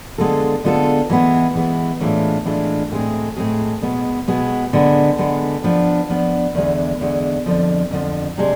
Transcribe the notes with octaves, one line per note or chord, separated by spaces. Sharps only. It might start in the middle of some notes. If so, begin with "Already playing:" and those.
D3 G#3 B3 F4 A4
D3 G#3 B3 F4 A4
E3 G#3 B3
E3 G#3 B3
A2 E3 G#3 D4 F4
A2 E3 G#3 D4 F4
A2 G#3 C4 G#4
A2 G#3 C4 G#4
B2 G#3 B3
B2 G#3 B3
D3 G#3 B3
D3 G#3 B3
F3 B3 D4
F3 B3 D4
E2 D3 G#3
E2 D3 G#3
F2 D3 F3
F2 D3 F3
C3 G#3 D4